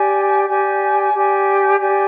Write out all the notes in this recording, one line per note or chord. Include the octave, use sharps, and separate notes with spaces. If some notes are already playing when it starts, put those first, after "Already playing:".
Already playing: G4 D5 G#5
G4 D5 G#5
G4 D5 G#5
G4 D5 G#5